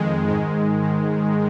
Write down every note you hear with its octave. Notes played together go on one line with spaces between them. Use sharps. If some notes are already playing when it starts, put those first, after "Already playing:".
Already playing: F2 D#3 G#3
G#2 D#3 G#3
G#2 D#3 G#3